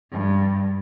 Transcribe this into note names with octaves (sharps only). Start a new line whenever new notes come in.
G2